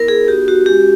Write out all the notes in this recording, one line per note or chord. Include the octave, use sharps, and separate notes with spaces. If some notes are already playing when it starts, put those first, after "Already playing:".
Already playing: B3 E4 A#4
G#4
B3 D#4 F#4 G4
F#4
G#3 C#4 F#4 G4